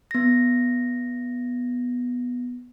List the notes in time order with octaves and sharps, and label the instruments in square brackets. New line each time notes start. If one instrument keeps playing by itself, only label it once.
[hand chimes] B3 A#6